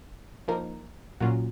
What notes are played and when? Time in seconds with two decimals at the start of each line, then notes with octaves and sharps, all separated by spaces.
0.48 F3 A#3 D#4 A#4
1.20 A#2 F#3 A#3 C#4 F4 F#4